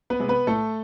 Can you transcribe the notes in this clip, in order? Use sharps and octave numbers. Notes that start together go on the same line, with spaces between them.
B3 B4
C3 G#3
B3 B4
A2 A3 A4